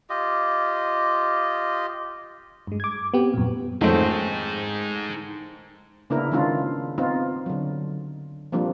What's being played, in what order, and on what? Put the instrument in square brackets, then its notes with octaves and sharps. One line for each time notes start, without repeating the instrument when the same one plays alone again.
[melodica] F4 G4 D#5
[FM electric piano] G2 G#3
D6 G#6
B3 C4 G4
F#2 A#2
[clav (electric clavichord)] F2 G#3 C#4 [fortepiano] D#3 A3 C4 [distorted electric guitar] D#4 G#4
[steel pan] C#3 A#3 B3 D4 E4 A#4
D#3 G#3 C#4 D4 F4
B3 C4 D#4 F4
D3 F#3
F3 G3 A#3 C4 D4